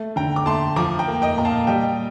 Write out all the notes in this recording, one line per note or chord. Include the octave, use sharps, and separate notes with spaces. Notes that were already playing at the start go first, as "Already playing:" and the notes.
Already playing: A3
D3 G5 A#5
D6
A3 A5 C6
F3 A#5 D6
G5 A#5
A#3
D#5 G5
A#2 A#5
F5 A5
G3 D#5 G5